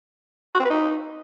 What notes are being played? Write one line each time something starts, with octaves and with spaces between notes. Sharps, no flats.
F#4
C4
B4
D#4